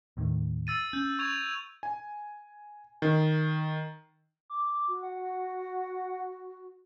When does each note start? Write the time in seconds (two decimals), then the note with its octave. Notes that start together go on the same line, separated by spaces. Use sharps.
0.17 D#2 A2 D#3
0.67 E6 A6 D#7
0.93 C#4 G6
1.19 C#6 G#6 F7
1.83 G#5
3.02 D#3
4.50 D6
4.88 F#4
5.03 F#5